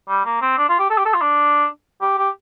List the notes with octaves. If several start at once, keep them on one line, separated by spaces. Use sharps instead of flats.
G3
A#3
C4
D4
F4
G4
A4
G4
A4
F4
D4
G4
G4